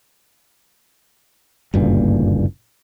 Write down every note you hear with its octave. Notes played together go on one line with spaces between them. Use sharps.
F#1 D2 G2 A#2